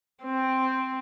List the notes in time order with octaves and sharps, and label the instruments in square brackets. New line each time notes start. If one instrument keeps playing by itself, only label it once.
[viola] C4